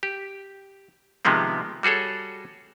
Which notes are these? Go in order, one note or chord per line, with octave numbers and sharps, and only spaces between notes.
G4
C3 D#3 F3 G#3 B3 C4
G3 F#4 G#4 A4 C#5